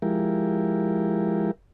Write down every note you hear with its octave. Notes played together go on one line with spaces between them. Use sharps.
F3 G#3 E4 G4 A#4